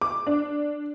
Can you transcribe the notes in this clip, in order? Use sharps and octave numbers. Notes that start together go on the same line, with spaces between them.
D6
D4